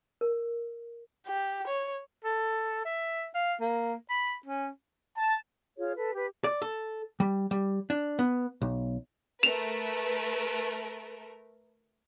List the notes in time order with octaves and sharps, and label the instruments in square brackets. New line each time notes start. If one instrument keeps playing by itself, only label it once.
[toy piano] A#4
[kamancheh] G4
C#5
[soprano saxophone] A4
E5
F5
A#3
B5
C#4
[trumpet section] A5
[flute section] F4 G#4 C#5
A4 B4
G4 B4
[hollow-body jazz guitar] D5
A4
G3
G3
D4
B3
B1
[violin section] A3 A#4 B4 [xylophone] E7 F7